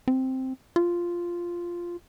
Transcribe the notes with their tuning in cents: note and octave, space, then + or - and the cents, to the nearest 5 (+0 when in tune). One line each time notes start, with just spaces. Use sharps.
C4 +0
F4 -5